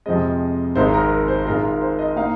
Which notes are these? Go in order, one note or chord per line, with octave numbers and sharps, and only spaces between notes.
F2 C3 F3 G#3 C4 D#5
G#1 G#2 G#3 D#4 C5
A#4
A#4
C5
G#1 G#2 G#3 F4 A#4
A#4
C5
D#5
A#2 A#3 D#4 F5